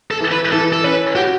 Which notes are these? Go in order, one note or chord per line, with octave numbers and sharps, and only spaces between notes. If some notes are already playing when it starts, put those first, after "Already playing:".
A4
E3
B4
E3 A4
A4
C#4 B4
F#4 G4